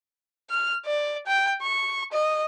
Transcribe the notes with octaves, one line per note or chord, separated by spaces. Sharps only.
F6
D5
G5
C#6
D#5